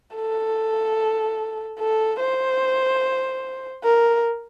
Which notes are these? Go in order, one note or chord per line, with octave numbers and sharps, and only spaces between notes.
A4
A4
C5
A#4